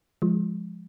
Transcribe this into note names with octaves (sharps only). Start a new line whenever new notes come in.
F3 G#3